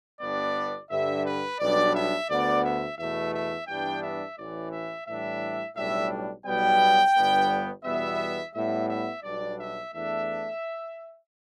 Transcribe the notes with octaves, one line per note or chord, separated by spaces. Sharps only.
G1 G2 G3 B3 D4 D5
G2 D3 G3 E5
B4
B1 B2 G3 B3 D4 D5
E5
D2 D3 B3 D5
E5
E2 B2 A3 E5
E5
G2 E3 G3 B3 D4 G5
E5
A1 A2 E3 D5
E5
A2 E3 G3 D4 E5
B1 A2 G3 D4 E5
B1 B2 G3 B3 G5
G1 G2 G3 B3
E2 B2 G3 B3 E5
A2 G3 B3 E5
E5
B1 B2 G3 D4 D5
E5
E2 E3 A3 D4 E5